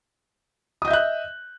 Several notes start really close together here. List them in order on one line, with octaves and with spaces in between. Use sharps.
D#6 D#5 G6 E5 F#6